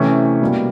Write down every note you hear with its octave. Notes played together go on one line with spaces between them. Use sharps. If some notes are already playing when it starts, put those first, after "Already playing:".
Already playing: C3 E3 A3 C#4
B2 G3 A#3